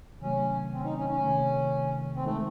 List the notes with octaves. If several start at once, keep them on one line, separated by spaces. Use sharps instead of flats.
C3 D#3 F#3 A3 C#4
C4
C#4
D#4
C#4
C#4
C3 D#3 A3
C4
D#3 G#3 A3 D#4